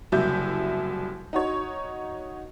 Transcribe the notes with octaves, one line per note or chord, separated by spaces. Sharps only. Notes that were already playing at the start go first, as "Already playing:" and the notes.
F#1 C2 F#3 E5 G6
D#4 F#4 C#5